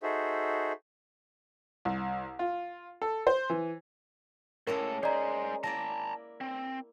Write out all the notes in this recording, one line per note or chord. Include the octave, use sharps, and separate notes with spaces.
D#4 F#4 G#4 A4 C5 E5
C2
F4
A4
C5
E3
A2 G#3 A#3 C#4 A4 A#4
G#4 C5 D5 D#5 A#5
A#3 E4 D5 A5 A#5 A#6
C4